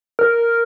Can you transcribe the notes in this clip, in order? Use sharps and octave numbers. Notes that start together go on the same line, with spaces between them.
A#4